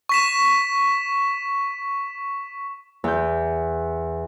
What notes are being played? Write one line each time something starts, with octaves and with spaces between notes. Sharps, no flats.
C#6 B6 E7
E2 G6